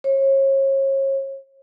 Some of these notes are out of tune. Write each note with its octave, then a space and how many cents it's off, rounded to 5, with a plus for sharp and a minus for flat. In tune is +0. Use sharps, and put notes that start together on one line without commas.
C#5 -35